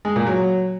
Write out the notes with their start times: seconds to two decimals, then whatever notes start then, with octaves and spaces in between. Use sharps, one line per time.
0.05 G#3
0.16 A#2
0.27 F#3